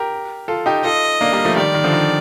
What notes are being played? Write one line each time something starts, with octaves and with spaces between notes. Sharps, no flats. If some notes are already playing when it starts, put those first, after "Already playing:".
Already playing: G4 A#4
F4 A4
D#4 G4
F4 A4 D#5
A#3 D4
G3 A#3
F3 A3
D#3 G3 D5
D#3
D3 F3
D#3